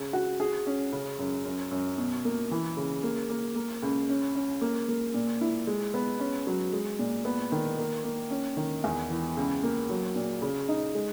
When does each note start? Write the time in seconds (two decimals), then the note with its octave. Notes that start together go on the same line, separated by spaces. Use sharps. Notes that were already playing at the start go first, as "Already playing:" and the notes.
Already playing: C#3
0.13 F#4
0.40 G#4
0.67 C#4
0.93 C#3
1.19 F#2
1.45 F#2
1.71 F#2
1.98 B2
2.25 A#3
2.51 E3
2.77 C#3
3.03 A#3
3.30 A#3
3.56 A#3
3.83 C#2
4.09 C#4
4.35 C#4
4.61 A#3
4.88 A#3
5.14 A#2
5.41 E4
5.67 G#3
5.94 B3
6.20 C#4
6.47 F#3
6.73 G#3
6.99 A#2
7.25 B3
7.52 D#3
7.79 A#3
8.04 A#3
8.30 C#4
8.57 D#3
8.84 E2
9.10 E3
9.37 C#2
9.63 A#3
9.90 F#3
10.16 A#2
10.42 C#3
10.68 D#4
10.95 G#3